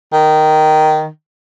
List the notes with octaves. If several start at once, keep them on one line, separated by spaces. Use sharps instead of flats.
D#3